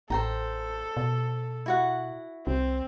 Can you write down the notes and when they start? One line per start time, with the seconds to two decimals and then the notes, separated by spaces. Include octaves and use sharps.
0.10 A1 A4 C5 G5 A#5
0.97 B2
1.66 E4 F#4 F#5
2.47 C2 C4